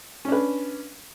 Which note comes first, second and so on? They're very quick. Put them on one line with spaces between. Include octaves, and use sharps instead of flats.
C#4 D4 B4